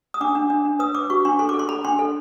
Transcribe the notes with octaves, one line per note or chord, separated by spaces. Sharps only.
D#6
D4 D6
D4
D4
D4
B4 D#6
B4 D6
F#4 C#6
D4 C6
A4 C6
D6
A4
C6
A4 B5
D4 C6
A4